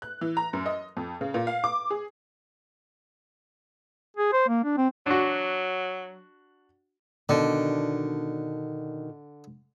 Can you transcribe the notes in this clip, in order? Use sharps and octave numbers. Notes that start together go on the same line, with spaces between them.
F#6
E3
A#5
F#2
D#5
F2
C#3
A#2
F5
D6
G#4
G#4
C5
A#3
D4
C4
F#3 D4 F#4
B2 D3 D#3 D4